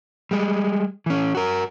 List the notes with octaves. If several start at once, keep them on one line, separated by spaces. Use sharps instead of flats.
G3 G#3
E3 C#4
F#4 A#4